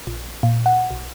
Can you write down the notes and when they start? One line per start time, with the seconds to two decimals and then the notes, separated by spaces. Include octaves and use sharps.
0.07 A#1
0.43 A#2
0.66 F#5
0.91 B1